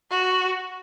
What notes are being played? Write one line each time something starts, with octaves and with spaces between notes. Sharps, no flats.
F#4